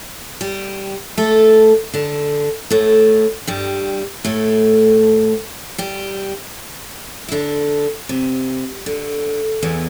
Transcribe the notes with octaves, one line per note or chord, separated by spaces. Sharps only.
G3 G4
A3 A4
D3 D4
A2 A3
G2 G3
A2 A3
G3 G4
E4
D3 D4
C3
D3
E2 E3